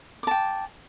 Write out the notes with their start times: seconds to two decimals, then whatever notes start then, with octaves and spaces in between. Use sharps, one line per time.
0.23 D6
0.27 A5
0.31 G5